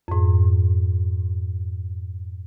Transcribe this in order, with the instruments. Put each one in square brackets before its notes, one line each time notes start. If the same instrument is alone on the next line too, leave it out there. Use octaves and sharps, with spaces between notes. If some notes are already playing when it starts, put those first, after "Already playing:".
[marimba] F2 G#2